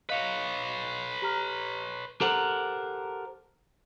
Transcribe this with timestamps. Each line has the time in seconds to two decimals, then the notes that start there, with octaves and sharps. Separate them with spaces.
0.09 B4 C#5 D#5 F5
1.22 G4 A#5 F6
2.21 G4 A4 A#4 C5 F#5